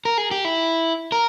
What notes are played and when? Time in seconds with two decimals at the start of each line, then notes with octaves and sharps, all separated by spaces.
0.05 A#4
0.18 G#4
0.31 G4
0.45 E4
1.12 A#4